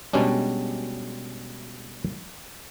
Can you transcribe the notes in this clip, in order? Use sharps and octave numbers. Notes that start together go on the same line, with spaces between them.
B2 G3 G#3 C#4 D4